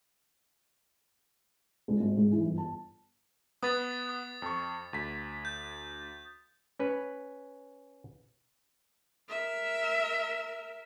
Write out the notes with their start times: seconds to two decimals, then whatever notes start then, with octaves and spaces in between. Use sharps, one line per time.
1.88 C#2
2.00 G#1
2.17 G#2
2.31 E3
2.43 G1
2.58 A5
3.63 B3 B4 D#6 A6
4.09 D#6
4.42 F2 C#6
4.93 D2 B6
5.45 G6
6.79 C#4 B4
9.29 A#4 E5